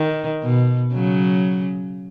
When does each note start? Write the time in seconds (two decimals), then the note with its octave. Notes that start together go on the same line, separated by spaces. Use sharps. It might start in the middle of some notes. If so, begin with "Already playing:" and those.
Already playing: D#3
0.43 B2
0.93 C#3 F#3